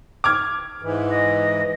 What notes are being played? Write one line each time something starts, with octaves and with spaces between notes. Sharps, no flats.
D6 F6 G#6
G#2 E3
D#5